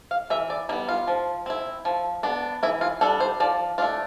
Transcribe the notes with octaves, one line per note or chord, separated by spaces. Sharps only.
F5
E3 E5
D5
G3 B3 E4
F4
F3
C4 E4
F3
B3 D4
E3 E4
F4
G3 D4 A4
C5
F3 D5
A3 D4 F4